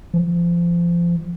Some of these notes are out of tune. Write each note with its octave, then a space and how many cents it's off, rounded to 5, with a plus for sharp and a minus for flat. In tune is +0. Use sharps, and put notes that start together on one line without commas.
F3 -25